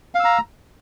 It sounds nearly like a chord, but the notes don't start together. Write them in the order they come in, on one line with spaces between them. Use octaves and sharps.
F5 E6 A#5